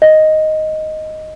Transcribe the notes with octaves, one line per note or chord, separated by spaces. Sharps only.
D#5